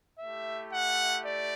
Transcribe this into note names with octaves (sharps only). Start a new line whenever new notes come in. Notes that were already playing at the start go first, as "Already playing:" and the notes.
A3 E4 G4 E5
F#5
D5